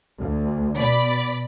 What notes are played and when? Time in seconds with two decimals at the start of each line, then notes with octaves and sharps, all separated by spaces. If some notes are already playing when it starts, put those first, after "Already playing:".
0.22 D2
0.78 B2 D5 B5